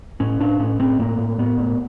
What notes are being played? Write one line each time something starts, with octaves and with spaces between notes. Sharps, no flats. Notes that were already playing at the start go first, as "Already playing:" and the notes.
A2 C#4
A2 D4
A2 C#4
A2 C4
A2 A#3
A2
A2 B3
A2